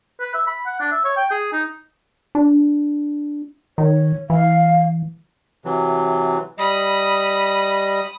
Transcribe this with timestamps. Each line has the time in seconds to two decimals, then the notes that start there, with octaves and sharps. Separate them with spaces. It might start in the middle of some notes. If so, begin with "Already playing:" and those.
0.21 B4
0.34 E5
0.47 B5
0.66 F#5
0.80 D4
0.92 E5
1.05 C#5
1.17 G5
1.31 G#4
1.53 D#4
2.35 D4
3.78 D#3 C#5
4.30 E3 F5
5.65 C3 E3 F#3
6.58 G3 D#5 B5 D#6